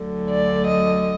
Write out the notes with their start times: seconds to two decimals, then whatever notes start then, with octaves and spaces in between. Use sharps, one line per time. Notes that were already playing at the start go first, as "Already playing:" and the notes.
Already playing: D2 D3 F#3
0.29 D5
0.67 D#5